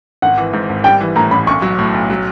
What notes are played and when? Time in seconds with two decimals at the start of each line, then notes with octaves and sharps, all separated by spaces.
0.22 G#1 F#5
0.38 E3
0.53 G#2
0.69 G#1
0.84 G3 G5
1.00 E3
1.16 A2 A#5
1.31 A1 B5
1.47 B1 C#6
1.62 F#3
1.79 A2
1.94 B1
2.10 F#3